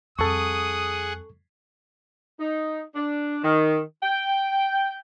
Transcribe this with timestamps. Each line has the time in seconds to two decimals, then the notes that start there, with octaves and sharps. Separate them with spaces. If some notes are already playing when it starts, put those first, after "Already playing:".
0.19 F2 G3 G#4 A4 F#5 C#6 D#6
2.39 D#4
2.95 D4
3.43 D#3
4.02 G5